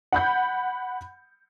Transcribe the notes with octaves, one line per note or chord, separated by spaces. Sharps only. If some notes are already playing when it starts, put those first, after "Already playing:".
F#5 B5 G6